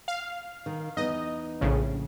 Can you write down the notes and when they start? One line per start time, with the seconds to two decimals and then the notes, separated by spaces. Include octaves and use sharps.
0.08 F5
0.66 D#3
0.97 E2 B3 D#4 D#5
1.61 A#1 A2 C#3